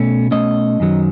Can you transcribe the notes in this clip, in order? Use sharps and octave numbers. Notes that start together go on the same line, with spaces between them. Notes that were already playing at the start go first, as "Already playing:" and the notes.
Already playing: B2 A3 C#4
B2 A3 C#4 D#5
F#2 D#3 F#3